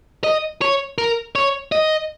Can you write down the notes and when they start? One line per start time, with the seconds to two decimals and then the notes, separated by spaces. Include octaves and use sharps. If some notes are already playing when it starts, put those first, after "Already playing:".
0.24 D#5
0.62 C#5
0.98 A#4
1.35 C#5
1.72 D#5